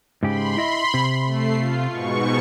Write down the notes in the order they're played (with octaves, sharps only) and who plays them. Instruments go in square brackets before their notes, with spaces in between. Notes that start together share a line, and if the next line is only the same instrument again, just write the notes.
[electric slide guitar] G#2 C#3 G4 [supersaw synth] B5 C6
[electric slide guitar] E4 D#5 E5
C3
[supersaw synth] A3 C7
F4
G#2 B2 C#6